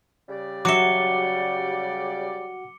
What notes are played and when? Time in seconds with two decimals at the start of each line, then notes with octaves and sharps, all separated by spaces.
0.29 C#3 G3 D5
0.65 F#3 F#4 E5 F#5 D6 C#7 G7